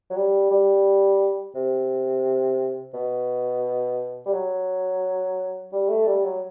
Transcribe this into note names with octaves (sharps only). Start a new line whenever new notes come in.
F#3
G3
G3
C3
B2
G3
F#3
G3
A3
G3
F#3